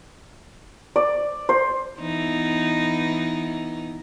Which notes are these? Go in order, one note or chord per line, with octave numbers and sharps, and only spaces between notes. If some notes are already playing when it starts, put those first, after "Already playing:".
D5
C5
E3 B3 D#4